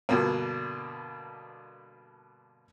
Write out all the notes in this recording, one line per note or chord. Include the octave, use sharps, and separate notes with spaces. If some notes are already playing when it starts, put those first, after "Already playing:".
G2 B2 D3 A#3